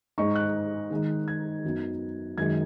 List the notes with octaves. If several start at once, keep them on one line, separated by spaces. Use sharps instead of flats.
G#2 G#3 D#4 C#6
F#6
D#3 G#3 D#4
G#6
F#2 F#3 B3 D#4
F#2 D#3 G#3 G#6